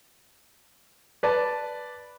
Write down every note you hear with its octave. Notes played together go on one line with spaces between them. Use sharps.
B4 D5 A5